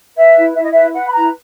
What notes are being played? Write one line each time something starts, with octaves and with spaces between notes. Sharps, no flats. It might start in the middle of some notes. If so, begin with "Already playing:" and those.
B4 E5
E4
E4 E5
D#5
B4 E5
B4 F#5
B5
E4 A#5